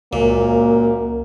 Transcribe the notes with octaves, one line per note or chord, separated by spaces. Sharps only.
C#2 F#2 A#2 A#3